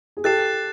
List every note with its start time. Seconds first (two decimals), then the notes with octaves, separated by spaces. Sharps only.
0.17 G#4
0.24 G4 A4 F#6 A6 C7 E7